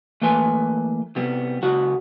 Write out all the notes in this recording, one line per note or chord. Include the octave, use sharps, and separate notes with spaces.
E3 A3 A#3 B4 G#5 C6
C3 G3 B3
C#2 C#3 F#4 F#5